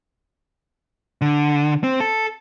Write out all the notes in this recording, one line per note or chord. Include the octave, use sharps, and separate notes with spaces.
D3
C4
A4